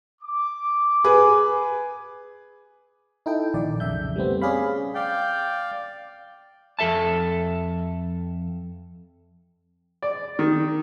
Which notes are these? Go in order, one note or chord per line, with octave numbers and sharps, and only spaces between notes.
D6
G#4 B4
D#4 E4 A4 G5
A#1 D#3 D5
B1 F2 C#3 E5 G6
G3 A3 B3 C4
C#4 G#4 D5 F5 B5
D5 F5 G5
F2 A4 E5 A5
D5
D#3